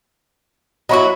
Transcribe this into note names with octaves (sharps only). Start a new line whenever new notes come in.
F#3 E4 F#4 D#5 B5 C#6